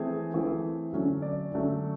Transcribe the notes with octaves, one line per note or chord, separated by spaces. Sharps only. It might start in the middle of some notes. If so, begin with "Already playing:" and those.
Already playing: E3 A3 C4 G#4
E3 A3 C4
D3 F#3 A3 C#4
D5
D3 F#3 A3 C#4